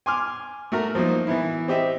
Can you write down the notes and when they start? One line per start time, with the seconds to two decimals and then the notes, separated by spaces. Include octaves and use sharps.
0.06 G#5 C6 D6 F6
0.72 A3 F#4 A#4
0.95 F3 F#3 A#3 D#4
1.27 E3 B3 E4
1.68 C4 G4 D#5 E5